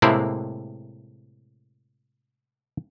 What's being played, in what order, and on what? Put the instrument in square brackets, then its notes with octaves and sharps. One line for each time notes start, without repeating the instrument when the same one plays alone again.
[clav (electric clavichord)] A2 C3 G#3 A#3 C4 E4